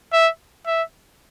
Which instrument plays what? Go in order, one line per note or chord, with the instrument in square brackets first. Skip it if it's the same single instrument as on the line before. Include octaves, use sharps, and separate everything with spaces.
[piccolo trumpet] E5
E5